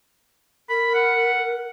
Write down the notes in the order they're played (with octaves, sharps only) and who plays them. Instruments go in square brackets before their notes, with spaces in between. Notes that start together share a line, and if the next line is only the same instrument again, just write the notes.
[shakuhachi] A#4 [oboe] B5
[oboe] F#5